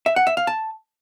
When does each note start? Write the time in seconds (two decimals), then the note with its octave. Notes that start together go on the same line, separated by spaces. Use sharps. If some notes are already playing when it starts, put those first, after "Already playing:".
0.06 E5
0.16 F#5
0.27 E5
0.37 F5
0.47 A5